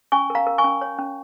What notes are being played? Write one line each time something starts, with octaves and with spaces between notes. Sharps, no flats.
C#4 G#5 C#6
A#4
F5 A#5
A#4
G#5 C#6
C#4
C#5
C#4